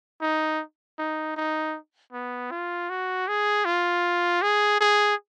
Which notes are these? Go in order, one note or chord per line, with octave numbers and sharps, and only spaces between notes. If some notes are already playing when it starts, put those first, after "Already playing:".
D#4
D#4
D#4
B3
F4
F#4
G#4
F4
G#4
G#4